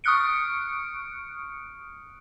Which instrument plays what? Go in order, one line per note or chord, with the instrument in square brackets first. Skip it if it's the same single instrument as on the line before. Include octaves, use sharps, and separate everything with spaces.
[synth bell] C#6 D#6 F6 F#6 C#7 D7